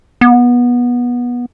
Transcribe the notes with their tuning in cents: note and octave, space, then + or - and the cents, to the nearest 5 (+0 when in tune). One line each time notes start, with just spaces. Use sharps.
B3 -20